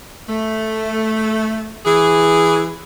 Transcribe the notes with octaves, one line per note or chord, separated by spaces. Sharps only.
A3
E3 G#4